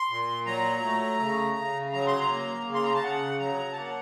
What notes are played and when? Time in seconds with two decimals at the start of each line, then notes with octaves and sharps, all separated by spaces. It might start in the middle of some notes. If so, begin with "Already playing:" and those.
Already playing: C6
0.10 A#2
0.46 F#3 A#5
0.83 A3
1.20 C#3
1.57 C#3
1.93 F#3 A#5
2.07 C6
2.20 A#5
2.30 A#3
2.67 C#3
2.74 C6
2.83 A#5
2.94 A5
3.03 C#3 F#5
3.40 F#3 A#5
3.73 A5
3.76 A#3 F#5